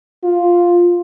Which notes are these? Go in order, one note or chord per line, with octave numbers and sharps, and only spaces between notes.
F4